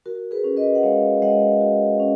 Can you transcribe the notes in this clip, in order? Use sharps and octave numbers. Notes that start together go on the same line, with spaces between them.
F#4 A#4
G#4 B4
C#4
B4 D#5
F#5
G#3 C#5 F5
G#3 D#5 F#5
F#4
C#4